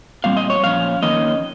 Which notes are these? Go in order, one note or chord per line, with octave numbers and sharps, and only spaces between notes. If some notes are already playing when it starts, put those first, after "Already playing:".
A#2 G3 C4 F5
D#5
C#5
A#2 F3 C#4 F5
F2 D#3 A#3 C#4 D#5